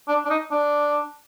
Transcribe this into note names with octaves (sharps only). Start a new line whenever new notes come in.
D4
D4
D#4
D4